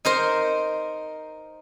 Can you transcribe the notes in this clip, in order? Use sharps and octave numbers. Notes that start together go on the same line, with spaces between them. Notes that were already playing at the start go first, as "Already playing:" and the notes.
D#4 A#4 C5